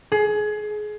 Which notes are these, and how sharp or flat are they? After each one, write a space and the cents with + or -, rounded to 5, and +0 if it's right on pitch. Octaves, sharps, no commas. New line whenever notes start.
G#4 +25